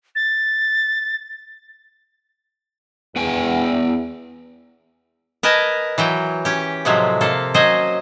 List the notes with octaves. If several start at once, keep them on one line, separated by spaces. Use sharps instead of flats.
A6
E2 B3 G5 G#5
A#4 B4 D#5 G#5 A5
E3 F#3 G5
C#4 G4
A2 C3 F3 F#3 G#3
C3 A#3 A4
F#3 C#4 C5 D#5 G#5